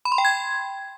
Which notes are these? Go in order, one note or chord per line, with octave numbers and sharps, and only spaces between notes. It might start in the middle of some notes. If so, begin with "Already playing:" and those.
B5
C6
G5
G#6